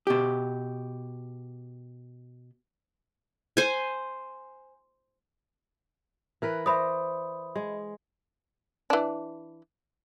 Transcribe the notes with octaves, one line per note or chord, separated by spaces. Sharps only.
B2 G4
C5 G#5
E3 A#4 B4
C5 D5 E5 B5 D#6
G#3
E3 D4